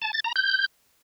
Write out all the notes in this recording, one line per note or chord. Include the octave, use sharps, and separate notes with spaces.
A5
A6
A#5
G6